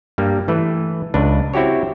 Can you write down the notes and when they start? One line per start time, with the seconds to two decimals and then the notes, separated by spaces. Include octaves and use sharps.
0.18 G2 G3 A#3
0.48 E3 A3 B4
1.14 C#2 D4 B4
1.54 C4 E4 F#4 G4 C#5